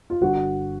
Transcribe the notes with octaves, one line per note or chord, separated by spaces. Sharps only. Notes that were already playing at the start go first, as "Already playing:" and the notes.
F4
G1 G2 D3 F#4